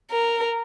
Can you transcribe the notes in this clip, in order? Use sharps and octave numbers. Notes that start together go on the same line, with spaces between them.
A#4